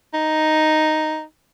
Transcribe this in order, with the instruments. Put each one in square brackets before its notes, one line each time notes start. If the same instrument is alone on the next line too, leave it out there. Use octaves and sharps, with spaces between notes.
[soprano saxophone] D#4